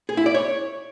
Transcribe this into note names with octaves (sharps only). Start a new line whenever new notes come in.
G#4
E4
D5
C#5